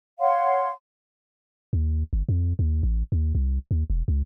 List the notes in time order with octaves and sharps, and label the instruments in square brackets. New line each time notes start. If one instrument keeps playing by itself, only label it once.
[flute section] C#5 F5 F#5 C6
[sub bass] D#2
G1
F2
D#2
A1
D#2
C2
D#2
E1
C#2